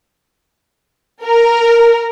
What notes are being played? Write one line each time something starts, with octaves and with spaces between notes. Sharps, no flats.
A#4